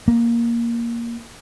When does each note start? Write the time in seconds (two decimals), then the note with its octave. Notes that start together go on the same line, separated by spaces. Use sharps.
0.08 A#3